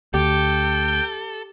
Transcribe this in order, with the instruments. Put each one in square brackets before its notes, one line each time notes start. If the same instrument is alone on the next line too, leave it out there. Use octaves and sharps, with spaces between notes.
[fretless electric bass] D2 [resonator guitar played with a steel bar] G4 [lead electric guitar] A4 [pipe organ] G5